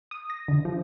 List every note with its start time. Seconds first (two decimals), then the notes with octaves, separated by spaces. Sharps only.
0.11 D#6
0.30 A#6
0.48 D3
0.65 F3